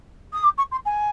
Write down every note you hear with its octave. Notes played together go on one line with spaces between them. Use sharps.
D#6
D6
C#6
C6
G#5